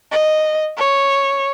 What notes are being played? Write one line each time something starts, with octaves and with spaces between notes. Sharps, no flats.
D#5
C#5